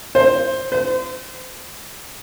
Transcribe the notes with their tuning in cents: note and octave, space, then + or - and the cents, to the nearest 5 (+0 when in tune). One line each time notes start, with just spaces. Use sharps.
C5 +10
C5 -35